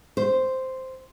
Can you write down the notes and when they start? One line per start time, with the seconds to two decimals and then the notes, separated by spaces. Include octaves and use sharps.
0.17 C5